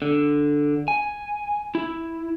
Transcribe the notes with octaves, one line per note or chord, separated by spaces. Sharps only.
D3
G#5
E4